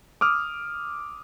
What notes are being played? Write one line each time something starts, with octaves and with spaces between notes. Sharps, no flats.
D6 D#6 F6